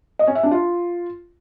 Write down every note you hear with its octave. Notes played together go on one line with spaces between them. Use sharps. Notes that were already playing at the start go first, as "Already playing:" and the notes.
D#5
C#4
E5
D4
F4